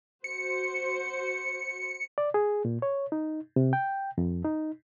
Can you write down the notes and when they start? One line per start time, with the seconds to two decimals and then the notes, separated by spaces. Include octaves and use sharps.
0.24 F#4 C5 C#7
2.18 D5
2.34 G#4
2.65 A#2
2.82 C#5
3.12 D#4
3.56 C3
3.73 G5
4.18 F2
4.45 D#4